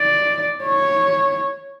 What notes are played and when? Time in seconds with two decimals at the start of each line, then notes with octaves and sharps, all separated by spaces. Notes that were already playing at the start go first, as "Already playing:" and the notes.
Already playing: D5
0.64 C#5